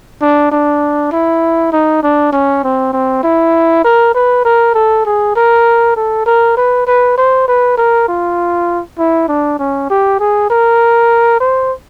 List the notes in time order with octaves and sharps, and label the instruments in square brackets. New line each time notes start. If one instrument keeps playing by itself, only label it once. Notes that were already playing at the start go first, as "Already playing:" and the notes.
[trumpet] D4
D4
E4
D#4
D4
C#4
C4
C4
E4
A#4
B4
A#4
A4
G#4
A#4
A4
A#4
B4
B4
C5
B4
A#4
F4
E4
D4
C#4
G4
G#4
A#4
C5